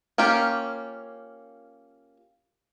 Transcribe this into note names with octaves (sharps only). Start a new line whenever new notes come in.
A#3 C#4 F4 G4